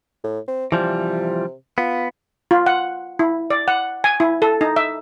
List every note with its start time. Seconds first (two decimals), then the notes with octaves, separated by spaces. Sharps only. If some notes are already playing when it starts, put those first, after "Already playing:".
0.24 A2
0.48 C4
0.72 C3 E3 F3 G3
1.78 B3 F4
2.51 F4
2.66 F#5
3.19 E4
3.50 D5
3.68 F#5
4.04 G#5
4.20 E4
4.42 A4
4.61 D#4
4.76 E5